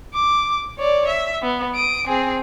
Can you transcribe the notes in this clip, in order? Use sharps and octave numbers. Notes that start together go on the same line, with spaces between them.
D6
C#5 D5
E5
B3
D#6 D7
C4 G#4